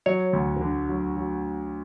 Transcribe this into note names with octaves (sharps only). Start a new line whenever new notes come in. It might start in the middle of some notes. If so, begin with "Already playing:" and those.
F#3 C#5
D2
D3
F#3
F#3